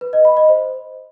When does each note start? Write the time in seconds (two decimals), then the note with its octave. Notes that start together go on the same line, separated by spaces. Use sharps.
0.01 B4
0.13 D#5
0.25 B5
0.37 D#5
0.49 C5